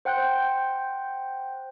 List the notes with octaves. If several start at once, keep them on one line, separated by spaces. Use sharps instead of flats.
C5 F#5 G5 F#6 G6